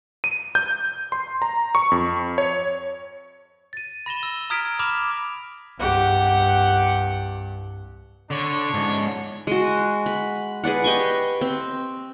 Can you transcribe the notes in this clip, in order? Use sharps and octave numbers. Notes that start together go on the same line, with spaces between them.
D#7
G6
C6
A#5
C#6
F2
C#5
A6 D#7
B5 A#6 E7 G7
E6
A#5 D#6 F6 G#6 B6 D7
B5 D6 F6 E7 F7
C2 G2 G4 F#5
D3 D4 C#5
C#2 G#2
G#3 F#4
B5
G#4 B4 D5 F#5
G4 D#5 C#6
C4